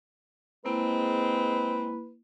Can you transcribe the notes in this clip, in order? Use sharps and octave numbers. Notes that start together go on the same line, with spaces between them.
G#3 A#3 C4 E4 B4